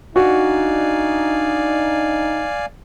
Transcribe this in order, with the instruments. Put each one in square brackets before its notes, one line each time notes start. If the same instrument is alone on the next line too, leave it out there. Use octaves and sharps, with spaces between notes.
[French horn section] D4 D#4 [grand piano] F#4 [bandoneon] D5 F5 G#5